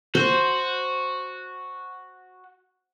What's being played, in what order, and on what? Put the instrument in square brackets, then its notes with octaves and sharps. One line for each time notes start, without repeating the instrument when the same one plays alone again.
[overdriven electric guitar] F#4 [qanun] C5